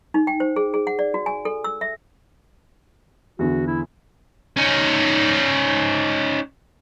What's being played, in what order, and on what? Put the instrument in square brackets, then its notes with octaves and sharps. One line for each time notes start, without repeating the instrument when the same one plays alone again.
[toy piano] D#4
G5
C5
G#4
G#4
F#5
D5
F#4
G#5
A4
E6
E5
[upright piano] E2 D3 [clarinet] F#4
[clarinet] E4
[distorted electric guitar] C#4 D#4